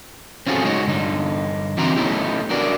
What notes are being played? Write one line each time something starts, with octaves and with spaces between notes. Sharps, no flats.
C4 C#4 F4 F#4 G#4 A4
G#3 D#4 F#4 C#5
G2 D3 D#4
E3 C4 D4 D#4 F#4 A#5
A3 B3 C#4 D#4 E4 G4
D4 F#4 A#4 B4 D5